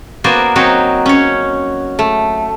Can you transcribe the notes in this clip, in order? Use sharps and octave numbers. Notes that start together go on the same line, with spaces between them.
A#3 B3 F#4 C5 D5 G#5
F#3 C4 D#4 F#4 C#5
C#4 C#5
A3